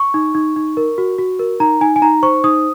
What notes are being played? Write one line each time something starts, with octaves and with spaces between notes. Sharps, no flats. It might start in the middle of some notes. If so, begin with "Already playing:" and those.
Already playing: C#6
D#4
D#4
D#4
A#4
F#4
F#4
A#4
D#4 A#5
D#4 G#5
G#5
D#4 A#5
C5 C#6
D#4 D#6